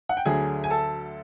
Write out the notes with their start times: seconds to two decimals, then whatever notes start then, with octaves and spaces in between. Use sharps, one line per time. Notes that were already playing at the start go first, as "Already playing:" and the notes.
0.09 F#5
0.17 G5
0.25 D2 D3 F#3 G#4 G#5
0.64 G#5
0.70 A4 A5